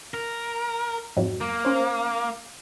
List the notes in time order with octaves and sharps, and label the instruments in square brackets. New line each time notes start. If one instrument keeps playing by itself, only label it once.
[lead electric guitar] A#4
[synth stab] F2 G#2 F#3
[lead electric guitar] A#3
[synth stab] C#4 C5